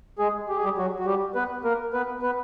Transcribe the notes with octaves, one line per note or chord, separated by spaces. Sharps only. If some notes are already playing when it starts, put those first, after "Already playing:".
G#3 G#4
G4
G#4
G3 G4
F#3 F#4
F#4
G3 G4
B3 B4
A#3 A#4
B3 B4
B3 B4